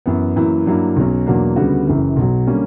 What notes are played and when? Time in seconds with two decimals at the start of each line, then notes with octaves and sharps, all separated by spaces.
0.06 F#2 E3 B3
0.36 F#2 E3 A#3 E4
0.66 G2 F#3 A#3 E4
0.96 B1 B2 F#3 C#4
1.26 E2 B2 F#3 A#3 D4
1.56 D2 C#3 G3 B3 F#4
1.87 F#1 F#2 C#3 E3
2.16 B1 B2 F#3
2.47 D3 G3 A#3 C#4